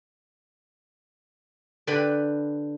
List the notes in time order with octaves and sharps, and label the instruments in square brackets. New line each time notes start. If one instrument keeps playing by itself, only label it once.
[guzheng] D3 G4 B4 B5